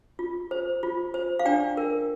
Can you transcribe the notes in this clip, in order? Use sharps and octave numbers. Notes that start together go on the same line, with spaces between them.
F4
C5
F4
C5
F5
D4 D5 G5
A#4